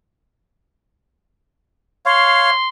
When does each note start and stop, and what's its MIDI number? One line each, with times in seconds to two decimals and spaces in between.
2.06 2.50 73
2.06 2.50 77
2.06 2.69 84